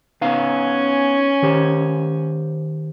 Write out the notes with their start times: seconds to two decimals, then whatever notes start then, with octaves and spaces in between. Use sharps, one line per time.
0.21 B3 C#4 D#4 F5 G#5
1.42 D#3 G4 C5